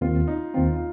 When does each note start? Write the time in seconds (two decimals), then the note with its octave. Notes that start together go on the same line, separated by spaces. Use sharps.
0.01 D#2 D#3 C4 F4
0.28 D#4
0.54 D#2 D#3 C4 F4
0.75 F4